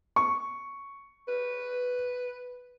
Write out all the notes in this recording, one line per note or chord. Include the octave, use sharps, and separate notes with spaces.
C#6
B4